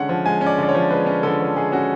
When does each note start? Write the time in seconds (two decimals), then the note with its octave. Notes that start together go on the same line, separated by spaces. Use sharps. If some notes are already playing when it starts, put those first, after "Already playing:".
Already playing: D3 G#3 C#4 C#5 F#5
0.09 F3
0.25 G#3 G#5
0.41 C#4
0.46 D5
0.58 D3 D5
0.69 C#5
0.75 F3
0.90 G#3 B4
1.07 C#4
1.23 D3 A4
1.40 F3
1.56 G#3 G#4
1.72 C#4 F#4